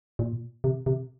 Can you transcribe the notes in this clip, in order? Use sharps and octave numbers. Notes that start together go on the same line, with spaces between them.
A#2
C3
C3